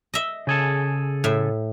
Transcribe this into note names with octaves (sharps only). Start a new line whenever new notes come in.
D#5 E5
C#3 G#4 A4
A2 E5